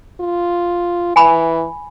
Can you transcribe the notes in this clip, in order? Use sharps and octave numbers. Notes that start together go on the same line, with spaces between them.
F4
E3 G#5 B5